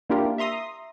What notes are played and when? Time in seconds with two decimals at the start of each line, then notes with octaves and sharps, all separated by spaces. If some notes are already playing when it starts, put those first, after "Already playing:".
0.10 A#3 D4 E4 F4 G4 A#4
0.38 E5 A#5 C6 D#6